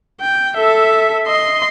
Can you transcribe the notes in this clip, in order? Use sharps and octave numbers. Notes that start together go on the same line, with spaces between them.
G5
A4 E5
D#5 C6